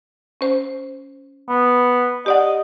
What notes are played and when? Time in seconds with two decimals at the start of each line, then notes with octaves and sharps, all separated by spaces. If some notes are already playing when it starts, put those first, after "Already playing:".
0.41 C#4 C5
1.49 B3
2.26 G4 D5 D#5 F#5